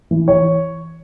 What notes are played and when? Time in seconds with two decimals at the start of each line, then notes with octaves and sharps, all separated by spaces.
0.11 E3
0.28 E3 C#5